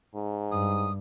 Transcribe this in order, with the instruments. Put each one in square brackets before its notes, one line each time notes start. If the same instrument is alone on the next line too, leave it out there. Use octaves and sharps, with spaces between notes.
[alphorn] G#2
[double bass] G2 [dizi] D#6